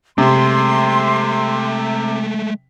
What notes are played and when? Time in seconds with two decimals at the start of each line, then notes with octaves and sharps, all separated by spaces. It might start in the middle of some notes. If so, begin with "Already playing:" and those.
0.18 C3 G#3 A3 C6